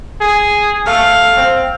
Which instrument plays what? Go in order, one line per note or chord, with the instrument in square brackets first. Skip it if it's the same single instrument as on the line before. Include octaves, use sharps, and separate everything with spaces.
[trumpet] G#4
[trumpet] A3 [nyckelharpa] F5
[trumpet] C4